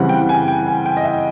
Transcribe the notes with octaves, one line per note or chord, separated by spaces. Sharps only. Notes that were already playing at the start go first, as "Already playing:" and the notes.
Already playing: C#3 E3 G3 C4 F#5
G5
G#5
G5
G#5
G5
D#5
E5